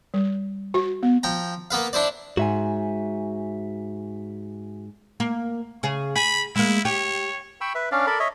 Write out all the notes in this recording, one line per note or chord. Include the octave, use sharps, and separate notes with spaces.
G3
F#4
B3
F3 G5 A#5
A#3 B3 B4 F5
D4 E4 C5 D5
G#2 F#4 E5 G#5
A#3
C#3 G#4
G#4 B5
G#3 A#3 E4
G4 C#5
G5 B5 C#6 E6
B4 E5
C#4 D4 D5 F5
A4 A#4 D5 B5
C#5 D#5 E5